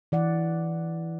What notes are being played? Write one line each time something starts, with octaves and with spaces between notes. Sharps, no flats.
E3 D5 F#5